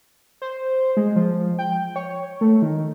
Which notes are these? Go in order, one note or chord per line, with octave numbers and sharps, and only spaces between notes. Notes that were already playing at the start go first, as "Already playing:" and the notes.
C5
G#3
F3
G5
C#5
A3
D#3